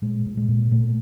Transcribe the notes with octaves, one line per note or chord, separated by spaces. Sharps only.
A#2 G#3
A#2
G#3
A#2
A#2 A3